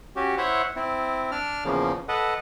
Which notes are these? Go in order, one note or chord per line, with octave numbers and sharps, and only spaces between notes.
C#4 F#4 G4
E4 C5 C#5 E5 F#5
C4 E4
D4 D5 F6
E2 C#3 F3 A#3
A4 B4 D#5 F#5